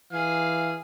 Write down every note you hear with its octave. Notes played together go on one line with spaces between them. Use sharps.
E3 G#4 F5 G#5